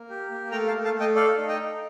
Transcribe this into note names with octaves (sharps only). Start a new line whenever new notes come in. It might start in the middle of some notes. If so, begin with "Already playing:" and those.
Already playing: A#3
G4
A#3
A3 G5 A#5
F5 A5
A3
F5 A5
A3 D#5 G5
A4 D5 F5
D#4
D#5 G5
D#4